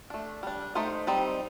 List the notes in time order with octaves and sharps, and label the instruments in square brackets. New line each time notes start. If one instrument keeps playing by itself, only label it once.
[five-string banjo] A3 D4
G3 D4
A3 D#4 C5
G3 C4 D#4